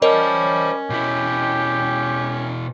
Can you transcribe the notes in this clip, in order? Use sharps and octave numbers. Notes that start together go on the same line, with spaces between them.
G3 C#4 A#4 C5 C#5 D#5 A5
B2 E4 G4